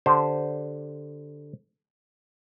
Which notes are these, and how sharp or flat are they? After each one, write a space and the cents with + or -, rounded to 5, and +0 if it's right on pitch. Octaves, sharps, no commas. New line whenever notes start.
D3 +0 G4 +0 C5 +0